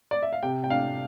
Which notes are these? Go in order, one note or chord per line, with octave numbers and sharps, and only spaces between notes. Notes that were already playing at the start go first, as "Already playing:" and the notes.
D5
E5
F5
C3 G5
G5
D4 F5